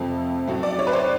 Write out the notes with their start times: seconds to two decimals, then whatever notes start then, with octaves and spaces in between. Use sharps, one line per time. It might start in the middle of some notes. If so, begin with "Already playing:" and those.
Already playing: F2 C3 F3 A3
0.47 A2 F#3 A3
0.63 D5
0.79 C#5
0.87 B4
0.93 C5